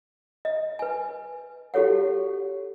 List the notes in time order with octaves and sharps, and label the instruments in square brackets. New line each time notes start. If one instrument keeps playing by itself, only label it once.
[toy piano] D#5
B4 G#5
F#4 G4 A4 C#5 F#5